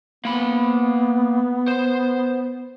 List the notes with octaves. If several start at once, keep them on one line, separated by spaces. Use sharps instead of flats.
A#3 B3 B5
C5